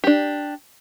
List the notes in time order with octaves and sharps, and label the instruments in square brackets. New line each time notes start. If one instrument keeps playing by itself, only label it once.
[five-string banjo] D4 G4